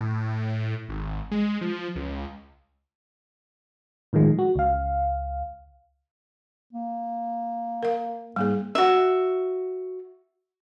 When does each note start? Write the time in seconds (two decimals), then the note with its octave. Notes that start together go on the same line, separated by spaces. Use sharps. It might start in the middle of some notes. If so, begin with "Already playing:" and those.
0.01 A2
0.89 G#1
1.31 G#3
1.61 F3
1.96 C#2
4.13 A2 D#3 F3 G#3
4.39 F#4
4.56 C#2 F5
6.73 A#3
7.83 A#4 F5
8.36 G#2 G3 A#3 G#4
8.75 F#4 E5